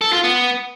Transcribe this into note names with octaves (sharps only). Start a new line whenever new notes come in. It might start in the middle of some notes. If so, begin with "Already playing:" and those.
A4
F4
B3